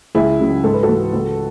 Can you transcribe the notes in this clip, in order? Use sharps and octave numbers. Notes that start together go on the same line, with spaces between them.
C#2 E4 G#4
C#3 F#3
G#2 A4
B4
F#4 A4
E3
C#2